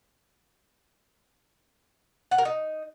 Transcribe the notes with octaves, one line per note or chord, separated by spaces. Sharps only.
F#5
A#4
D#4